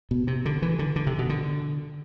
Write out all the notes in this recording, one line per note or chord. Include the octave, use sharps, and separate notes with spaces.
B2
C3
D3
E3
D3
D3
C3
B2
D3